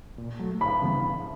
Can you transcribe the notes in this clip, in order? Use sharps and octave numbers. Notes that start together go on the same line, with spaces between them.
A#2
F#3 A3
D2 B5
C#3 E3 G3 B3